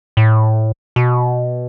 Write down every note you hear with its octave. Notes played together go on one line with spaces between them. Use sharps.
A2
B2